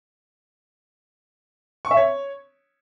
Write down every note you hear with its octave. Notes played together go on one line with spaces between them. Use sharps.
C#6
E5
C#5